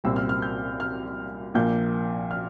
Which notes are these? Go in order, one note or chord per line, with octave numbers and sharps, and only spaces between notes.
C2 A#2 G3 C4 E6
F6
F6
G6
F6
A#1 A#2 F3 A#3 G6
F6